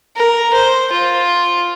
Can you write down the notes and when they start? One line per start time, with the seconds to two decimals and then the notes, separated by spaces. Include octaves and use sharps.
0.16 A#4
0.54 C5
0.92 F4